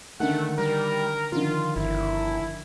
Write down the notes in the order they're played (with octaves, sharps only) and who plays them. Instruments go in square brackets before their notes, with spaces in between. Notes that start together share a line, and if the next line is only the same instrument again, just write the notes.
[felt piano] D3 D#3 [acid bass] A3 [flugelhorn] F#5
[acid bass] G3 [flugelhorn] A#4
[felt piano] D3 D#3 F3 [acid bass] F4
[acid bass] G1 [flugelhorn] E4